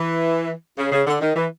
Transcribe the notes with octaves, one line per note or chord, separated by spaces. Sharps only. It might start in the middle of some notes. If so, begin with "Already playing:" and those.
Already playing: E3
C#3
C#3
D3
D#3
E3